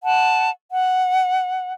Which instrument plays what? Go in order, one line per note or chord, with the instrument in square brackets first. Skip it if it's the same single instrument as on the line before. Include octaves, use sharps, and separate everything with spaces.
[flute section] F#5 A5
F#5